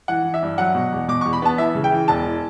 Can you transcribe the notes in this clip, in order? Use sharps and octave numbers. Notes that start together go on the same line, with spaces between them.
E3 F#5
E3
E5
G2
F#3 F#5
B2
E2
B2 D6
E2 C#6
B5
B3 A5
E3 E5
C#3
G5
E3
E1 A5
E3